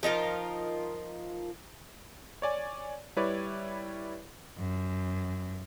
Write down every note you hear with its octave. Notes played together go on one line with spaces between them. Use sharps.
F3 D#4 F4 A#4
C#5 D5 G#5
G3 E4 B4 C#5 D5
F#2